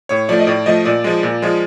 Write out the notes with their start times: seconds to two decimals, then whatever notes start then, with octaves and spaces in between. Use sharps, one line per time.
0.09 A2 C#5
0.29 F3 A3 D5
0.39 D#5
0.47 A2 D5
0.66 F3 A3 D#5
0.85 A#2 D5
1.04 F3 G#3
1.23 A#2
1.42 F3 G#3